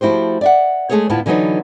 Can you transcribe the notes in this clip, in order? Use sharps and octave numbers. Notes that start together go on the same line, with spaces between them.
F3 A3 E4 F#4 G4 C5
D5 E5 F#5
G#3 A3 B3 G#4 A4 C#5
D2 A2 B3 E4 F4 A5
D3 E3 F#3 B3 D#4 C#5